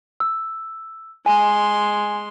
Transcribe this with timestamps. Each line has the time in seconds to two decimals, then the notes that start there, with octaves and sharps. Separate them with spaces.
0.20 E6
1.26 G#3 G#5 C6